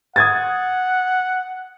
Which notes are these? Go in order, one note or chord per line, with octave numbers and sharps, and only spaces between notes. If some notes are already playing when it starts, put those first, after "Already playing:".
F#5 D#6 G#6 A6